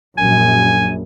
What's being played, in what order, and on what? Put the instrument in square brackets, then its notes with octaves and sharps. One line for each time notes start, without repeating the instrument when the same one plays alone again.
[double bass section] A#1 F#2 [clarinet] G#5